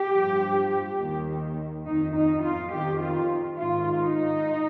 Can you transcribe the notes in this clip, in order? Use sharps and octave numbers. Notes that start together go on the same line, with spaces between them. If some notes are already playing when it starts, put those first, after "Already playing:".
Already playing: G4
G2 F3
D#2 D#3
F2 D#3 D#4
D#4
F4
F2 D#3 G4
F4
G#2 D#3 F4
D#4